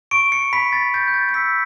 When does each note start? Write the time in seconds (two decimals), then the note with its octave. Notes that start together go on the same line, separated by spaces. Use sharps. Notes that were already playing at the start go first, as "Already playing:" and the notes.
0.11 C#6 D7
0.32 C#7
0.53 B5 B6
0.73 A6
0.94 G6 A6
1.08 G6
1.14 A6
1.29 C#7
1.34 E6 B6